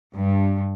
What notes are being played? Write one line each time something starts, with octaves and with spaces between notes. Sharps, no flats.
G2